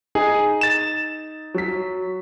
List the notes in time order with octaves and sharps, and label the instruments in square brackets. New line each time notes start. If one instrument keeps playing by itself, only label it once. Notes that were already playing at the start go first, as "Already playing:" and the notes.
[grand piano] D#4 [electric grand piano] G#4
[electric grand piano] A6 E7
[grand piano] F#3 B6